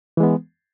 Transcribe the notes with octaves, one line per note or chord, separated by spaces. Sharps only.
E3 G#3 B3